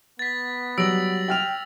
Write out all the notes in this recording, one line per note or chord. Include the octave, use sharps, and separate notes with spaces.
B3 A6 B6
F#3 G3 E6 A#6 D7 F#7
G5 F6 F7